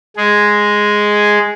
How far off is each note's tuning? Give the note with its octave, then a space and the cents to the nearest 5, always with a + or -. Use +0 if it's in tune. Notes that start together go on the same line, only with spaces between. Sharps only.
G#3 +0 G#4 +0